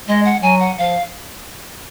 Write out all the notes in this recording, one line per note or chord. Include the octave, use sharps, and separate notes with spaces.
G#3 D#5
F#5
F#3 G#5
F#5
F3 F5